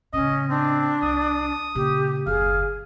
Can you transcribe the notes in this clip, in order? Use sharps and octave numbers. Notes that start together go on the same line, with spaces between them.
A2 C#3 C#4 D#5
C4 D4
C2 D#6
A#2 C#3 G4
F#1 D#2 G#4 F5